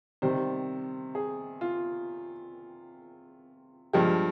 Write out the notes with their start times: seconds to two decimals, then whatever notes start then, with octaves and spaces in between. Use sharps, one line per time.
0.22 C3 D#3 G3 C5
1.15 G#4
1.61 F4
3.93 G2 F3 G#3 G4